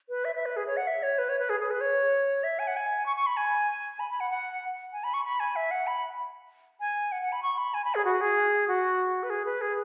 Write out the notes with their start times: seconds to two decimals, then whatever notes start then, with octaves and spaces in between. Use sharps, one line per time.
0.09 B4
0.25 E5
0.35 E5
0.46 B4
0.56 G#4
0.67 C#5
0.77 F#5
0.87 E5
1.03 C#5
1.18 B4
1.29 C#5
1.39 B4
1.50 G#4
1.60 G#4
1.71 B4
1.81 C#5
2.44 E5
2.59 G#5
2.67 F#5
2.76 G#5
3.06 C#6
3.16 C#6
3.27 B5
3.37 G#5
4.00 B5
4.10 B5
4.20 F#5
4.31 F#5
4.93 G#5
5.04 B5
5.14 C#6
5.24 B5
5.40 G#5
5.56 E5
5.71 F#5
5.87 B5
6.80 G#5
7.12 F#5
7.22 F#5
7.32 B5
7.43 C#6
7.58 B5
7.74 G#5
7.85 B5
7.95 G#4
8.05 F#4
8.21 G#4
8.68 F#4
9.23 B4
9.30 G#4
9.45 B4
9.61 G#4